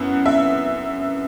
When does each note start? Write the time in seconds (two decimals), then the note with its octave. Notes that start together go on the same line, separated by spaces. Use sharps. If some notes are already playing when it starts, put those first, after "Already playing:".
Already playing: F#2 B3 E4 F#5
0.26 E5